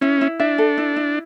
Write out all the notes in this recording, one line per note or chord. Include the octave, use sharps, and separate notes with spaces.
C#4 E4
E4
D4 E5
A4
E4
E4